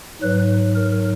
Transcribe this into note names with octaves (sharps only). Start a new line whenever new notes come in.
G#2 F#3 B4
A#4